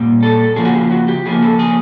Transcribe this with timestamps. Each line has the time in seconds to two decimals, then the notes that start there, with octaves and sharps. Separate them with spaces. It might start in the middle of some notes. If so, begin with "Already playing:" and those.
Already playing: A#2 G3
0.23 A4
0.56 C#3 F3 A#3 G#4
0.65 F#4
0.74 G4
0.91 F#4
1.08 G4
1.25 C#3 F3 A#3 G#4
1.42 A4
1.59 G#4